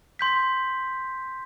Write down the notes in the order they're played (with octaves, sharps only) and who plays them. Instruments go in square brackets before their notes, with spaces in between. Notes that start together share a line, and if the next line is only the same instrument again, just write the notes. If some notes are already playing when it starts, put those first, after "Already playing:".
[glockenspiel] C6 G6 B6